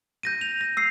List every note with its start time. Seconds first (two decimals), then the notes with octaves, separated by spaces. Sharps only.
0.23 G6 A#6 D#7
0.41 F7
0.61 A#6
0.77 E6 C7